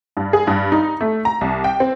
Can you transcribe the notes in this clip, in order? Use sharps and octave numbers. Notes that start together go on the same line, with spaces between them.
G2
G#4
G2
D#4
A3
A#5
C2
G5
C4